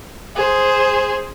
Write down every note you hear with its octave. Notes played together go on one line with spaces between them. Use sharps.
G#4 C5